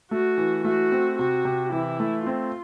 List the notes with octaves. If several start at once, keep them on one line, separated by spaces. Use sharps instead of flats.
A3 F#4
E3
A3 F#4
C4
C3 F#4
C3
E3 E4
A3
C4 F4